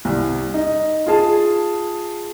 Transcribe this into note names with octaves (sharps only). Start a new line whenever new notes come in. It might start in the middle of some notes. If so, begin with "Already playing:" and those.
C2
D#4
F4 G#4 A5